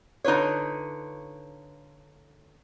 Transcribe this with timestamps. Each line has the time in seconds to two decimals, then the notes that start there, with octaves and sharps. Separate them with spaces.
0.24 D3 D#4 F4 B4 C#5